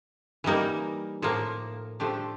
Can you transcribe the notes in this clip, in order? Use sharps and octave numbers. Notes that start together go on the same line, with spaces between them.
E3 G3 A#3 D#4
A2 F3 A#3
F3 A3 D4 G4